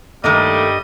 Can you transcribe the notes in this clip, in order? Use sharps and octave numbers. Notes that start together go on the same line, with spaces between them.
G2 D#3 G3 A3 A#3 D#5